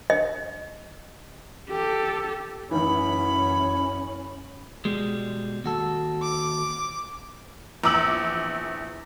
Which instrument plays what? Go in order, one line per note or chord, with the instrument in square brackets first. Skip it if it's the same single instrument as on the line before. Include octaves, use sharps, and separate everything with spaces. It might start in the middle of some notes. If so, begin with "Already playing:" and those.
[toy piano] D#5
[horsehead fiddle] G4 A4
[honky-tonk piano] A1 D#3 E3 [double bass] F#2 C#4 [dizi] B5
[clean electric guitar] B2 G3 G#3
D#2 F#4 A4
[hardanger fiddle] D6
[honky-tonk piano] A#1 E2 D6 E6 F#7